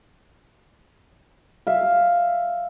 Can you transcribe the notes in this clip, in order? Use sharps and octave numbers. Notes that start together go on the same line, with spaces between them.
E5 F5